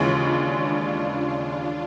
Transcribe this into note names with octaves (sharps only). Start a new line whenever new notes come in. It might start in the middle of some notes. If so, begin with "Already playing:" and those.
Already playing: D#2 C#3 E3 G#3 C#4 F4
D4